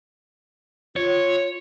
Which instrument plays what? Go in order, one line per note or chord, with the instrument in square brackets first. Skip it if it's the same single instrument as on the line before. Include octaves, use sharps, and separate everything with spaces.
[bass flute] F4 [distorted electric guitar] C#5